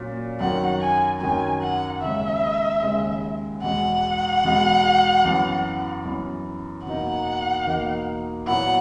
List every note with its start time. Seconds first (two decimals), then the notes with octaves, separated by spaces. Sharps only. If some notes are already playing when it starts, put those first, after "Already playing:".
Already playing: A#2 F#3 C#4
0.40 F#2 D#3 F#3 F#5
0.81 G#5
1.21 F#2 D#3 F#3 G#5
1.62 F#5
2.02 D#2 C#3 G#3 E5
2.83 D#2 C#3 G#3
3.63 E2 B2 G#3 F#5
4.44 E2 B2 G#3
5.25 F#2 E3 B3
6.05 F#2 E3 B3
6.86 E2 B2 A#3 D#4 F#5
7.67 E2 B2 A#3 D#4
8.47 A#2 F#3 B3 E4 F#5